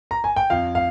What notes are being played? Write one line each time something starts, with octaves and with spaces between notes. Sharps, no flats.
A#5
G#5
G5
F2 F5
F5